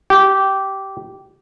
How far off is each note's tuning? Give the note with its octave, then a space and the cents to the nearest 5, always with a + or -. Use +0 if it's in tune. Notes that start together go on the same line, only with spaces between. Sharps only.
G4 -15